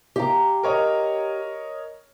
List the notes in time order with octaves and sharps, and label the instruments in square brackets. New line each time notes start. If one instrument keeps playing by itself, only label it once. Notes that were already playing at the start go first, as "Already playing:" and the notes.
[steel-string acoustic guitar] G4 F5 A#5
[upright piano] A#4 C#5 D#5